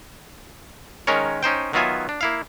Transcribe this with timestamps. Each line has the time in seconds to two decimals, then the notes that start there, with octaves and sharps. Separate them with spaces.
1.07 D#3 G#3 C#4 A#4 C#5
1.43 C#4 D#4 C5 G5
1.73 D#3 F#3 B3 F4 E5 G#5
2.09 D4
2.21 A#3 E4 F5